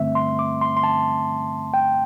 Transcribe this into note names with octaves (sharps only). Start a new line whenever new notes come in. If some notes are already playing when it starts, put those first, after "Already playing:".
Already playing: G2 D3 A3 C4 E5
C6
D6
C6
C6
A5
G5